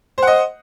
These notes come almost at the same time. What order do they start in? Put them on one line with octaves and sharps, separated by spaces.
C5 F#5 D#5